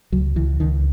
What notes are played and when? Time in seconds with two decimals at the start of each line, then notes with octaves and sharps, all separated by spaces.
0.12 C#2 F#3
0.36 C#2 E3
0.60 C#2 D#3